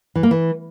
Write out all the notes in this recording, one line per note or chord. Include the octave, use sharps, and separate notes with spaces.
E3
A#3
E3